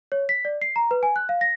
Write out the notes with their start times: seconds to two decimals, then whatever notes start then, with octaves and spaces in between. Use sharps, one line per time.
0.12 C#5
0.29 B6
0.45 D5
0.62 C7
0.76 A#5
0.91 B4
1.03 G#5
1.16 F#6
1.29 F5
1.41 A#6